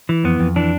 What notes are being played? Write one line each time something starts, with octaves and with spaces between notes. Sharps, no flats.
E3
F2 B3
F2
E3 D4